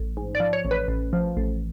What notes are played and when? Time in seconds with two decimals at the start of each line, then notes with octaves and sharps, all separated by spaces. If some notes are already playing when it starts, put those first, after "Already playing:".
Already playing: A1
0.17 G#2
0.35 D5
0.40 F3
0.53 C#5
0.65 A1
0.71 B4
0.88 A1
1.13 F3
1.37 A1